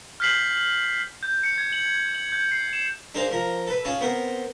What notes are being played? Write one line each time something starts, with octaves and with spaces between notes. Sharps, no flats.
F6 G6 B6 C7 F#7
G6
C#7
G#6
F#7
F#7
G6
C7
E7
D4 G#4 A#4 C5 F5 A#5
F3 A#4 A#5
A4 B4
C#4 F4 G#4 A5
B3 C4 A#4 C5